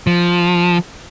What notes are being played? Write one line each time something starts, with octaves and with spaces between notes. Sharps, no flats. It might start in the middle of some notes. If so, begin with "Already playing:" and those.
F3